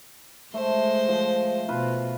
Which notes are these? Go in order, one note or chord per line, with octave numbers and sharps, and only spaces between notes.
G#3 A3 C5
F3
B2 F4 B4